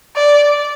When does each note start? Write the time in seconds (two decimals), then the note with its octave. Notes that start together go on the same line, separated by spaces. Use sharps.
0.16 D5